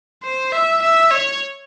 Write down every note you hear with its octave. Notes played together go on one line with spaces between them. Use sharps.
C5
E5
E5
C#5